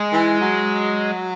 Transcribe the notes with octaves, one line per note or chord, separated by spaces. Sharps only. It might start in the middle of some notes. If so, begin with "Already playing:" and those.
Already playing: G#3
E3
F#3